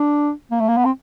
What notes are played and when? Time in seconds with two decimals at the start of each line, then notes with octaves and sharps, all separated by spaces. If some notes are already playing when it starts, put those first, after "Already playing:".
Already playing: D4
0.51 A#3
0.60 A3
0.69 A#3
0.77 B3
0.85 C4